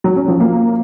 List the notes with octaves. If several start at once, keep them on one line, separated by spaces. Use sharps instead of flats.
F#3
C#4
F3
A#3